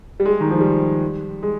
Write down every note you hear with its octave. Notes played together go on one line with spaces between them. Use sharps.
G3
G#3
G3
D#3
F3
G3
G#3